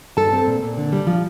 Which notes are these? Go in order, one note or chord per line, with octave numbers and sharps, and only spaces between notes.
G2 A4 A5
C4
A#2
A#2
D3
G3
F3